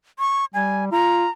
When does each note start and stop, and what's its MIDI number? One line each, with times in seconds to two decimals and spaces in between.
0.19 0.45 85
0.54 0.90 55
0.54 0.85 80
0.92 1.26 65
0.92 1.30 82